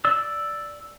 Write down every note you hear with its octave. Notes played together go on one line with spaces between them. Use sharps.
D5 E6